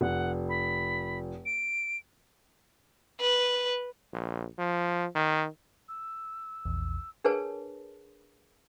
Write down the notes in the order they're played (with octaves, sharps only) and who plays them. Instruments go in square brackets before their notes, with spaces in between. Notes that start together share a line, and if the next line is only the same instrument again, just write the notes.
[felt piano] F1 [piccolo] F#5
[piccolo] B5
D7
[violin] B4
[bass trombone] A#1
F3
D#3
[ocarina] E6
[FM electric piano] A#1 E2
[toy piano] D4 G#4 A#4 B4 C#5 A5